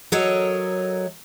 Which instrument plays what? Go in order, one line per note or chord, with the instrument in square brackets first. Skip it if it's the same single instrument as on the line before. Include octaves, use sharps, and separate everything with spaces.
[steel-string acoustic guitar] F#3 A4 A#4 C#5 D#5